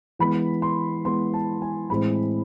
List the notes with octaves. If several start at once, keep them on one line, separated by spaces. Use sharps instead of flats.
E3 G#3 B3 B5
C6
E3 G#3 B3 C6
A5
G#5
A2 E3 G#3 C4 B5